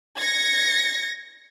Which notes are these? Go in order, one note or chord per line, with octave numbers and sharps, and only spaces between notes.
G#6 A#6 C#7